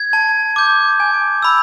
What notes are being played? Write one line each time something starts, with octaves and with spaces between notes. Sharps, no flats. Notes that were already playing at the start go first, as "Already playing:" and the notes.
Already playing: G#6
A5
D6 G6
G#5
B5 E6